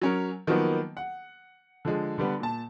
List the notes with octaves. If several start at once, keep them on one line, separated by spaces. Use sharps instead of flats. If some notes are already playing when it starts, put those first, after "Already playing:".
F#3 C#4 A#4
D#3 F3 F#3 A#3 B3 D#4
F#5
D3 F3 G#3
D3 G3 B3
A#2 A5